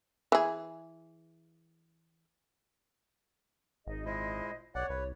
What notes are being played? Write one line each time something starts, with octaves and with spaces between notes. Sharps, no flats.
E3 G#4
G#1 D#4 G#4 D#5
A#2 G#3 E4 C5 D#5
B1 C#5 D5 F#5
C2 B4